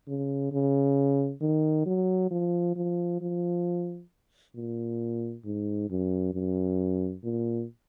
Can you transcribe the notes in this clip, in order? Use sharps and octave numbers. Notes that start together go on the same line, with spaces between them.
C#3
C#3
D#3
F#3
F3
F3
F3
A#2
G#2
F#2
F#2
A#2